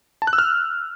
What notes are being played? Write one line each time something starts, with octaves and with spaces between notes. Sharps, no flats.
A5
F#6
E6
F6